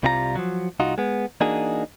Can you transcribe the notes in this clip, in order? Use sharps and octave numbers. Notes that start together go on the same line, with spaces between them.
C2 C3 G3 F4 G#4 A#5
F3 F#3
C2 D#4 F4 F#4
G#3 B3
E3 A#3 D4 D#4 F#4 G#4